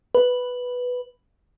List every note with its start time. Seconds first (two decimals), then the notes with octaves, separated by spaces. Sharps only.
0.15 B4